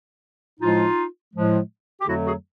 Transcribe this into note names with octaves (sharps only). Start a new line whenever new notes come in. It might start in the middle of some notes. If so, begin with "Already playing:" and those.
A2 F3 G#3 D#4 F4
A2 F3 G#3
G4
F2 D3 F#3 A3 E4 F#4
F#4 G#4